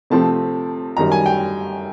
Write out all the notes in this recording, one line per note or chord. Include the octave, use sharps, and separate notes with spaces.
C3 F3 A3 C4 A5
F#2 D#3 G3 A#5
G#5
G5